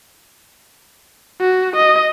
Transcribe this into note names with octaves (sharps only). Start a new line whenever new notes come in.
F#4
D#5